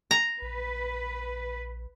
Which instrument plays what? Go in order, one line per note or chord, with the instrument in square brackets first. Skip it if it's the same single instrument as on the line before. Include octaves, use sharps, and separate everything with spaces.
[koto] A#5
[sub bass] A#1 [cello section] B4